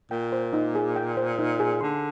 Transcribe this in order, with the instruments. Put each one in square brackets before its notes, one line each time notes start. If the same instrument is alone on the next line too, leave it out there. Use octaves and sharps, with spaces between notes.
[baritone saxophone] A#2 [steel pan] G5
[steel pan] C5
D#4
G#4
G5
C5
D#4
G#4
[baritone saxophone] D3 [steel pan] C6